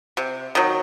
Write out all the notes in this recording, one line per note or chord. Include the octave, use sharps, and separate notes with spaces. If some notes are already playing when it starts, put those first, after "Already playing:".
C3
D#3 F#3